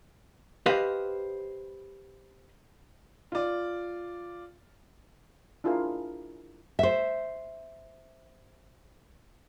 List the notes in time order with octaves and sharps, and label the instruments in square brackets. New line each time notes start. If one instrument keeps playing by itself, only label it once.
[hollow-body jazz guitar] G4 B4 C5 D#5 F5
[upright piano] F4 D5
[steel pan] D4 E4 F4 G#4 A#4 F5
[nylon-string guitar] C5 E5